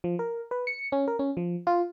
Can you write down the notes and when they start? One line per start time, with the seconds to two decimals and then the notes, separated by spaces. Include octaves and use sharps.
0.04 F3
0.19 A#4
0.51 B4
0.67 C#7
0.92 C#4
1.08 A#4
1.19 C#4
1.37 F3
1.67 F4